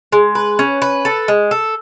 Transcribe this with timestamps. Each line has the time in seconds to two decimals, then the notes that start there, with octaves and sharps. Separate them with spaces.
0.12 G#3
0.35 B4
0.59 C#4
0.82 B4
1.05 A4
1.28 G#3
1.51 A4